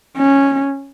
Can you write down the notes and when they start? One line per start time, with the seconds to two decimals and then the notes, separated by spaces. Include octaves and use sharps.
0.17 C#4